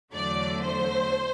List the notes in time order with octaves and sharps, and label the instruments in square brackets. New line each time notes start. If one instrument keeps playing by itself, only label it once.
[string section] E2 D3 F#3 A3 D5
C5